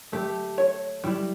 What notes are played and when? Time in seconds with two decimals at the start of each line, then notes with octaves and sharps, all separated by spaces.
0.12 A3 G4
0.58 C#5
1.03 G3 E4